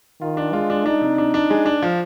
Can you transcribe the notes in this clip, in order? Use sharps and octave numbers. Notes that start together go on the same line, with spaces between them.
D#3 F4
D4
G#3 F4
D4
D4 D#4
C3
D4
D4
G#3
D4
F3